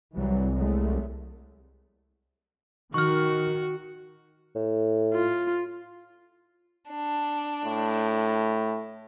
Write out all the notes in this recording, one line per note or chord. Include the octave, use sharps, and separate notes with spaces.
C2 E3 F#3 G3
F#3 G#3 A3
D#3 F#4 C#6 F6
A2
F4
D4
A2